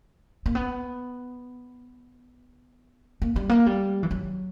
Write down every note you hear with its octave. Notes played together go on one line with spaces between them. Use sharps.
A#3
B3
A#3
G3
A#3
G3
E3
F#3